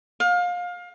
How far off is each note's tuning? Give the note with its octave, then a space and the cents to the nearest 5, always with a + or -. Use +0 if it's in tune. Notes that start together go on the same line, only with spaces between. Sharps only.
F5 +25